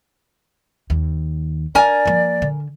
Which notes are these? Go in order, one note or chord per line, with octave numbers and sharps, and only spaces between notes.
D#2
D4 A#4 D5 G#5
F3 A#3
D3